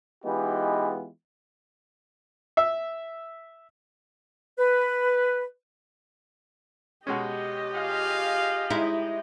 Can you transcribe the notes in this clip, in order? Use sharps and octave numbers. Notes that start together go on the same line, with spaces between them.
E3 G#3 B3 D#4 F4 G4
E5
B4
B2 G#3 C#4 G4 D#5
F4 G#4 F5
G#3 D#4 E4